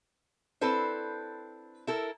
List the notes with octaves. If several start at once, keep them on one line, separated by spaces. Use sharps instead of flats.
C4 D4 E4 A4 B4 C5
E4 A4 A#4